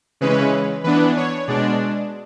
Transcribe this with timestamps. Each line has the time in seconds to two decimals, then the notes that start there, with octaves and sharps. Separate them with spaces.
0.21 C#3 E3 G#3 C#4 B4
0.84 E3 B3 D4 B4
1.17 C#5
1.48 B2 G#3 D4 D5